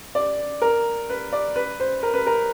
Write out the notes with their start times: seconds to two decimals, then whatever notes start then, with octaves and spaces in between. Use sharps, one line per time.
0.15 D5
0.62 A#4
1.10 B4
1.33 D5
1.56 B4
1.80 C5
2.03 A#4
2.14 B4
2.27 A#4